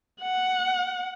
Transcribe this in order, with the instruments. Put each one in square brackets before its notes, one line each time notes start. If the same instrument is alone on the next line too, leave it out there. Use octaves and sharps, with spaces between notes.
[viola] F#5